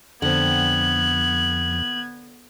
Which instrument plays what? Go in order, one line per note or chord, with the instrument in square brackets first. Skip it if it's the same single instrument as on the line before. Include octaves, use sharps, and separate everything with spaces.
[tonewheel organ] F2 [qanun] D3 C4 [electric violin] B3 G#6 [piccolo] F#7